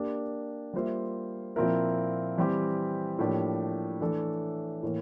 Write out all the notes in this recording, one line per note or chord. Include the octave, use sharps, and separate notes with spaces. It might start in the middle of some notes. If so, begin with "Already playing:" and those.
Already playing: A#3 D4 G4 D5
G3 A#3 F4 C5 E5
A#2 F3 C4 E4 A#4
E3 G3 C4 G4
A2 F3 A#3 D4 G4
E3 A3 D4 A4
A2 E3 A#3